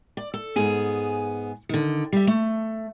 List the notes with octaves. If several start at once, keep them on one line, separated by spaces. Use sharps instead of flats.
D5
A4
G#2 B3 G#4 G#5
D3 D#3
G3 E5
A3